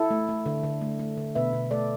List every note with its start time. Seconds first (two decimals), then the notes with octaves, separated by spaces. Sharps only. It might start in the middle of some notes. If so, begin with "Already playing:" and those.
Already playing: E4 A4
0.11 A3
0.29 A3
0.46 D3
0.64 D3
0.81 A3
0.99 A3
1.17 D3
1.35 B2 B4 E5
1.53 B2
1.71 A3 A4 D5